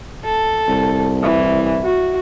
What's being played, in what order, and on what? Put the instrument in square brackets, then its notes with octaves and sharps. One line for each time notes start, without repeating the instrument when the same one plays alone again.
[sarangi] A4
[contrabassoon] C2
[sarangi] E3
F#4